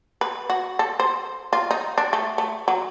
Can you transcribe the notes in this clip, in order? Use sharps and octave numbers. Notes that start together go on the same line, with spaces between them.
B4
F#4
A4
C5
F4
D#4
D4
A3
A3
F#3